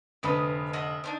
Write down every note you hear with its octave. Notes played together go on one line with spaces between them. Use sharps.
F1 D3 B4 D#5 D#6
D#5 E5 F#5
C4 D4 D#4